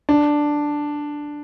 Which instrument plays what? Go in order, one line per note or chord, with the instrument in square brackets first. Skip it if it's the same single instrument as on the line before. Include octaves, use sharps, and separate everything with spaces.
[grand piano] D4